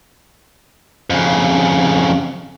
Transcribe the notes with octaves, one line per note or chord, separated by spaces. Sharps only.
F2 C#3